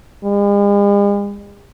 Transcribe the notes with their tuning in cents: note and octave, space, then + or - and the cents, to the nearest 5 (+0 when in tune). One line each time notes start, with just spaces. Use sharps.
G#3 -45